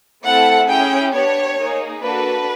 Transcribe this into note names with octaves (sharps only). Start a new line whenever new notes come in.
A3 C4 E4 A4 F#5
C#4 E4 G#4 G5
B3 D4 G4 C#5
A#3 D#4 G#4
A#3 D4 F#4 A4 B4